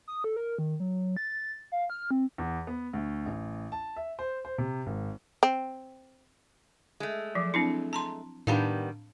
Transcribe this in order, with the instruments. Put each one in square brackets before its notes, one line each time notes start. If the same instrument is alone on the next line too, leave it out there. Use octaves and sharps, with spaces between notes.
[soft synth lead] D#6
A4
A#4
D#3
F#3
A6
F5
F6
C4
[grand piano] E2
B3
D2
A1
A5
E5
C5
C5
C3
G#1
[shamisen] C4
[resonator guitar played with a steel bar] G#3 A3
[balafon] F3 F#3
C4 D4 E4
A5 A#5 C6
[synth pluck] A2 D4 [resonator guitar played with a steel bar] D#3 G3 B3 [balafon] F5 A5 B5